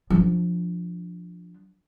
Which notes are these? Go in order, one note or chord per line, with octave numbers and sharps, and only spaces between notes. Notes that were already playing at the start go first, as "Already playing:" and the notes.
F3 D4